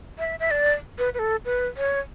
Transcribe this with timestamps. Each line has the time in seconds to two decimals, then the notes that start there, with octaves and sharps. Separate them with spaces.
0.19 E5
0.40 E5
0.51 D5
0.99 B4
1.14 B4
1.19 A4
1.45 B4
1.77 C#5